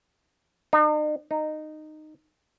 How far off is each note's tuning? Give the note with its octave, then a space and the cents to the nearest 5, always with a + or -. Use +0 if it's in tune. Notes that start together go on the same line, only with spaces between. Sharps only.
D#4 -45
D#4 -15